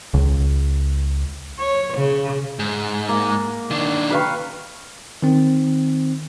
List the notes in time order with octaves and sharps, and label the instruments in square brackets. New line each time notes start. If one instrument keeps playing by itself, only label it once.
[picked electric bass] C#2
[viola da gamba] C#5
C#3
[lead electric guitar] G#2
[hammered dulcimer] A#3
[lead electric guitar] D#3 D4
[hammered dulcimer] B4 F5 C#6
[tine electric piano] D#3 C4